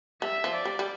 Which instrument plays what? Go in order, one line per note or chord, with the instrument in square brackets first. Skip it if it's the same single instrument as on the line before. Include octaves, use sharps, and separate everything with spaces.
[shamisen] G3 [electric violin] E5
[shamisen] F3
[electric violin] D5
[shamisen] G3
G3